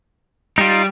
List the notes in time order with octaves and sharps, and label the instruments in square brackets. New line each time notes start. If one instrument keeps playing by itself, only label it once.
[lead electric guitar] G3 [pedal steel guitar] D#4 F4